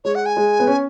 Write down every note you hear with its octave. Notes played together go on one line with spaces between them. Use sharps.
G#3 C#5
F#5
G#5
G#3
B3
C#4